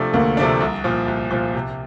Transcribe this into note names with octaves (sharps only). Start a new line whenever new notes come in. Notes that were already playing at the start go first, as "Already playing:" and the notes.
Already playing: C3 F3 A3 D4
D2 A#3 A#4
C3 F3 A3 D4
C2
A#2 F3
C2
A#2 F3
C3